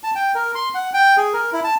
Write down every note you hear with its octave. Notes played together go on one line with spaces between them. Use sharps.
A5
G5
A#4
C6
F#5
G5
G#4
A#4
E4
A5